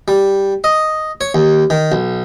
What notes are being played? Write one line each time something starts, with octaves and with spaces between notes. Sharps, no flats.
G3
D#5
C#5
D#2
D#3
B1